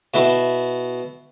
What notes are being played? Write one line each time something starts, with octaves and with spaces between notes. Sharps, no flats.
B2 E4